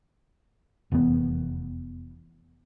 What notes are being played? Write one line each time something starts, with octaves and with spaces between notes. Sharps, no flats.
F1 E2 B2 B3